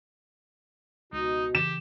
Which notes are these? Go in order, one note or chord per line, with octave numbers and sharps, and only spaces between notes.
C#2 B2 D#4
C#3 E3 G4 E7